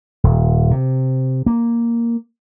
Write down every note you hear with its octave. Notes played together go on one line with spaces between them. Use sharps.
D#1
C3
A#3